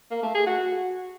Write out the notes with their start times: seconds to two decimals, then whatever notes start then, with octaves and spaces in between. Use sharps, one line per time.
0.11 A#3
0.23 A3
0.34 G#4
0.46 F#4